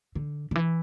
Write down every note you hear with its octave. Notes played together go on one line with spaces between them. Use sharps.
D3
D3
E3